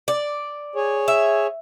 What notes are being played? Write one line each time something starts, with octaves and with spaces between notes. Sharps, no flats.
D5
G#4 C#5
E5